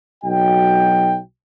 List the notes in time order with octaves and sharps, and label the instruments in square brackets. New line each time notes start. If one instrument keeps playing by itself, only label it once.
[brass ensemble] B1 F#3 F#4 D#5 G5